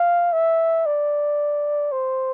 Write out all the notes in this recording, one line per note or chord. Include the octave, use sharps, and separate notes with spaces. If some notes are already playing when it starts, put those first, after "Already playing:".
Already playing: F5
E5
D5
C5